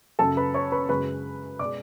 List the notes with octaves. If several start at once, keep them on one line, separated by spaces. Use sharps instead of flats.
F#2 C#3 F#3 A4 A5
B4 B5
C#5 C#6
B4 B5
F#2 C#3 G#3 B4 B5
B2 G#3 D5 D6